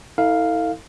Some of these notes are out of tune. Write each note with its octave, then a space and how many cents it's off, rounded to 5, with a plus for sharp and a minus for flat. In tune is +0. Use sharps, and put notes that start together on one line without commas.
E4 -40 A4 +30 F5 +0